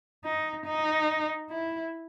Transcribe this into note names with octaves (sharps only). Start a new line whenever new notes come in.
D#4
D#4
E4